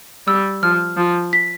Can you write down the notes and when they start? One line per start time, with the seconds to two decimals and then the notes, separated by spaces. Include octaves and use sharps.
0.27 G3 E6
0.63 F3 F6
0.97 F3
1.33 B6